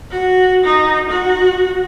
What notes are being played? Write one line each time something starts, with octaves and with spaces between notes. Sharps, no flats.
F#4
D#4
F#4